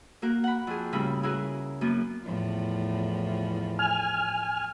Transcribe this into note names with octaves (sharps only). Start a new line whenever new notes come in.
A#3 F#4 A#4
F#5 B5
F2 G#4
A2 C#3 G3 E4 A#4 B5
E4 F#4 G#4 A#4 B4
F#2 A#3 B3
E2 A2 F3
G#5 F6